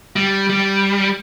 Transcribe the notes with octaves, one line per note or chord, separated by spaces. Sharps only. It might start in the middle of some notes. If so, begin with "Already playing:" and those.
G3
G3